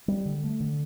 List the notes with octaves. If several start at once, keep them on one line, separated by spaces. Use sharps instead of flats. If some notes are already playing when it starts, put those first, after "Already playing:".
G3
D3
A3
D3